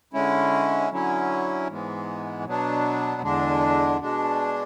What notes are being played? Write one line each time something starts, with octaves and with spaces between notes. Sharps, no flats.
D3 G#3 C#4 E4
D3 F#3 C#4 E4
G#2 E3 G#3 B3
B2 F#3 B3 D4
E2 D3 G#3 D4
B2 G#3 D4